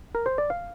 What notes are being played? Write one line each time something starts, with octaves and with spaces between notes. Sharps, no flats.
A#4
C5
D5
F5